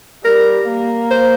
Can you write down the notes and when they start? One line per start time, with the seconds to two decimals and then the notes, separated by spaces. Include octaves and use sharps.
0.24 G3 A#4
0.68 A#3
1.11 C5